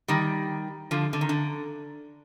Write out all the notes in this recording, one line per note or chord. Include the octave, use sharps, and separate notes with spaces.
D#3 G3
D3 F3
D3
D#3
D3